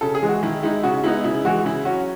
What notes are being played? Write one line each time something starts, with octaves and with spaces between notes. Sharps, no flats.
C#3 A4
G#4
E3 G#3
F#4
D#3 E4
G#3 D#4 E4
C#3 F#4
G#3 B3 D#4 E4
C#3 E4
E3 G#3 F#4
C#3 E4
F#3 C#4 F#4